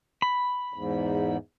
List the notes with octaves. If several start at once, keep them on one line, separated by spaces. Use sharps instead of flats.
B5
E2 G#2